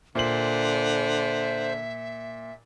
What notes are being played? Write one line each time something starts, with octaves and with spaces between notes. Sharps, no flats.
A#2 D3 C5 E5 F#7